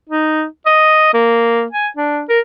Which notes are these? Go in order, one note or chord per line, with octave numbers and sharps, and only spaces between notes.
D#4
D#5
A#3
G#5
D4
A#4